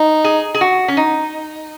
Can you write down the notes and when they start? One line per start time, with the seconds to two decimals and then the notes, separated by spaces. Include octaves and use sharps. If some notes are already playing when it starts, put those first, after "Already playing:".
Already playing: D#4
0.24 G#4
0.55 G#4
0.61 F#4
0.88 C#4
0.97 D#4